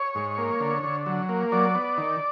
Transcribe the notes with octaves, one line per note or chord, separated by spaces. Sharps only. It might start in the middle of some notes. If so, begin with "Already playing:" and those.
Already playing: C#5
G#2
A#3
D3
D3
F#3
A#3
F#3 D5
B3
D#3